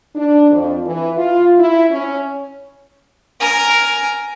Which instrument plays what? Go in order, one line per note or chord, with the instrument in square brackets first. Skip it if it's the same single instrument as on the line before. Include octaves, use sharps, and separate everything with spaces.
[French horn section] D4
F2
E3
F4
E4
C#4
[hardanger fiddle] A#4 G#5